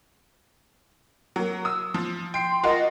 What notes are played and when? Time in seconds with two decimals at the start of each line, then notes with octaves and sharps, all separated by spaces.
1.36 F#3 A#3
1.65 D#6 E6
1.94 F3
2.34 G5 C6 C7
2.64 F4 F#4 A#4 D#5